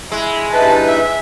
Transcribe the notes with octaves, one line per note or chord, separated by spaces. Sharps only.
G#3 E4
G2 D#4 E4 B4 A5
E5